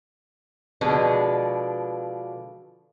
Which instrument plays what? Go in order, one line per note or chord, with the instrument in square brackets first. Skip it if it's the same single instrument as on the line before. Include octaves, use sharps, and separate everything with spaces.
[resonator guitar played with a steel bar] B2 D3 F3 G#3 D4 B4